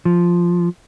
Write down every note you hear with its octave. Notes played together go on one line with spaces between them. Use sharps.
F3